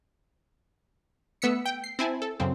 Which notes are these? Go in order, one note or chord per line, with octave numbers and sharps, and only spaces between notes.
A3 B3 E6 B6 C#7
G5
C7
C4 E4 G#5 A5
A4
F#2 C#3 C4